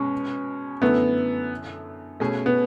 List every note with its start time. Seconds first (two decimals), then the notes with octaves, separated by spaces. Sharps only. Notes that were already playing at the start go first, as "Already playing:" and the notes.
Already playing: B2 G#3 B3 C#4
0.82 F#2 D3 A3 B3 E4
2.20 B2 A3 C#4 G#4
2.46 B3